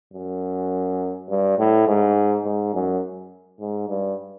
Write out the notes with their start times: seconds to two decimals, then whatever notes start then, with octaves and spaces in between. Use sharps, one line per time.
0.13 F#2
1.29 G2
1.58 A2
1.87 G#2
2.44 G#2
2.74 F#2
3.60 G#2
3.89 G2